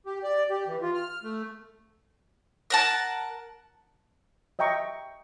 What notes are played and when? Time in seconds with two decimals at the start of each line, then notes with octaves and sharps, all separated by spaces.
0.06 G4
0.24 D5
0.50 G4
0.67 E3
0.82 F4
0.95 F6
1.23 A3
2.70 A#4 F#5 A5
4.59 D#5 E5 G5 A#5 C#6